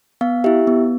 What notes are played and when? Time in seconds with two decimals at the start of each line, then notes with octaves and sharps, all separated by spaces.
0.21 B3 F5
0.44 E4 G4 E5
0.67 B3